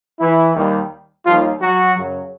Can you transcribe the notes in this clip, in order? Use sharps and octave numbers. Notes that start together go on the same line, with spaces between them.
E3 E4
D#2 D#3 G3
D#2 D#3 F3 G3 F4
F#3 F#4
F#2 C#3 F#3